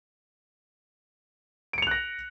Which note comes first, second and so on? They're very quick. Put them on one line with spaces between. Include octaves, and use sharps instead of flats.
D7 C#7 F7 F#6 A#6